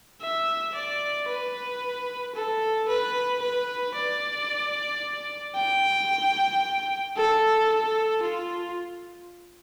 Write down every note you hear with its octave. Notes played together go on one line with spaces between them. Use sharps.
E5
D5
B4
A4
B4
B4
D5
G5
A4
A4
F4